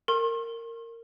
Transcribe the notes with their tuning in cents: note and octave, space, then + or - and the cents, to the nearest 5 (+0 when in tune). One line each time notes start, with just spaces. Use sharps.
A#4 -20 C6 +45